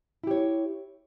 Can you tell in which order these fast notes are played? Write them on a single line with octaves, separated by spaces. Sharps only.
E4 G4 C#5